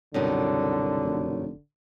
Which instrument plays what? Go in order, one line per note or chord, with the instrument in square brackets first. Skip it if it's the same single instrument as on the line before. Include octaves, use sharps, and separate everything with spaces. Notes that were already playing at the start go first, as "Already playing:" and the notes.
[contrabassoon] C2 [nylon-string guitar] F#2 B2 D#3 [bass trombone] D3
[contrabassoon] F1